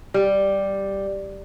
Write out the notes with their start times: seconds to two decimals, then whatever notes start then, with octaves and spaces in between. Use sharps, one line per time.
0.14 G3